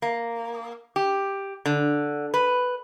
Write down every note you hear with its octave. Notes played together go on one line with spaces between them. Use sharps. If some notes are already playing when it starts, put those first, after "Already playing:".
A#3
G4
D3
B4